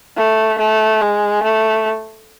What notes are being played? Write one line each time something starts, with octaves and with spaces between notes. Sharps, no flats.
A3
A3
G#3
A3